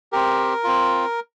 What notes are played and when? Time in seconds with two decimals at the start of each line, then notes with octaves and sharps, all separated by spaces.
0.13 C4 G4 A#4
0.64 C4 F4